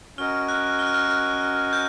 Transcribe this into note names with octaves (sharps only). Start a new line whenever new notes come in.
C#4 F#4 A#4 D#5 F6
F#6
F6
F#6
F6
F#6
F#6
G6